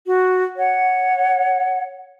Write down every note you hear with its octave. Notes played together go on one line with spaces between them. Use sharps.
F#4
C#5 F#5